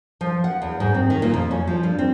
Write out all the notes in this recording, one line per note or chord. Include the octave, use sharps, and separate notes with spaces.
F3
F#5
E2
G#2
C4
D#3
A#2
F2
C#4
F3
G2
C4